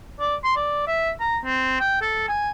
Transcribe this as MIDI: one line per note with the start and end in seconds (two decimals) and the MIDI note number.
0.20 0.36 74
0.44 0.54 84
0.57 0.84 74
0.88 1.11 76
1.20 1.37 82
1.45 1.76 60
1.80 2.01 79
2.02 2.24 69
2.29 2.51 80